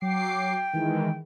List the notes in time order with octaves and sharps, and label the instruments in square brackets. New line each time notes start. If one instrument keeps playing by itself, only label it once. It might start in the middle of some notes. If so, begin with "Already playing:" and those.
[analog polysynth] F#3 D6 C7 [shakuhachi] G5
[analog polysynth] D#3 E3 G#3